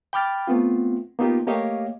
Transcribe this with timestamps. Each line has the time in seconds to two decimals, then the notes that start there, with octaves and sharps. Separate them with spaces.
0.13 G5 B5 D6 F6 A6
0.47 A3 B3 C4 F4
1.19 A#3 B3 D#4 F4 G4
1.47 A3 A#3 G4 C#5 D#5 F5